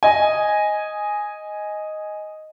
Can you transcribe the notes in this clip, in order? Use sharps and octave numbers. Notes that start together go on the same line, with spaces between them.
D#5 G#5